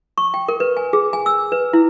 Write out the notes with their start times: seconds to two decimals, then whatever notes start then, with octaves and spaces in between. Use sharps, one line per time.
0.18 C#6
0.34 G5
0.48 A#4
0.60 B4
0.77 G#5
0.93 G#4
1.13 G#5
1.26 E6
1.52 B4
1.73 E4